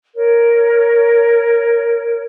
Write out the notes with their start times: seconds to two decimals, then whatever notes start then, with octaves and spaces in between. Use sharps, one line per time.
0.15 A#4 C#5